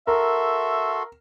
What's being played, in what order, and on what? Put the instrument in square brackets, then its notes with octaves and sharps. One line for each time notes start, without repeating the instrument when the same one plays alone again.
[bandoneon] F#4 A4 C6 [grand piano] A#4 [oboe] E5